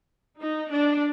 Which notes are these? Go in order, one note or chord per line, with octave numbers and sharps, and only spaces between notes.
D#4
D4